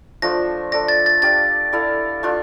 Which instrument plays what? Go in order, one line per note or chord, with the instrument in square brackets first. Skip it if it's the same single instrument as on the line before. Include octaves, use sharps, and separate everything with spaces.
[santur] F3 A3 D4 F4 [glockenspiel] A#6
[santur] D4 A4 D5 [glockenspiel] A#6
[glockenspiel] A6
A6
[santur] D4 G4 D5 F5 [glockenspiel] A6
[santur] E4 A4 D5 F5
A3 D4 F4